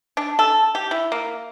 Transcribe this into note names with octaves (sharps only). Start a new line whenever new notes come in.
D4
A4
G4
E4
A#3